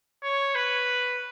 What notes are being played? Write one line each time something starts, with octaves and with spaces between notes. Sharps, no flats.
C#5
B4